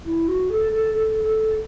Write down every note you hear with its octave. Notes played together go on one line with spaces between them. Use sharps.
E4
F#4
A4
A4
A4
A4